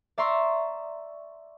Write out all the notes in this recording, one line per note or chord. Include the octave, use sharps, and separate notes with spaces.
D5 E5 A#5 C6 C#6 E6